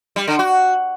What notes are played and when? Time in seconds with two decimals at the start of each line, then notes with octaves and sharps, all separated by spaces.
0.16 G3
0.28 D3
0.39 F#4